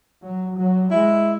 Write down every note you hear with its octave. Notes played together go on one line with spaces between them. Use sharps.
F#3
F#3
G#3 E4